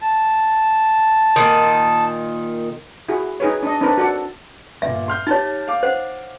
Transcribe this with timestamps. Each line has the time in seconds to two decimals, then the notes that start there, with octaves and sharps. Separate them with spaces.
0.02 A5
1.36 A#2 D#3
3.09 E4 F#4 G#4
3.40 D#4 G#4 B4 C#5
3.63 D4 D#5
3.81 C4 D4 D#4 A#4 B4
3.98 F#4 A4 D5 F#5
4.82 G1 A#2 E5
5.08 C6 F6 G6
5.27 D#4 G4 C#5 A5 A6
5.68 F5 D6
5.83 C5 F#5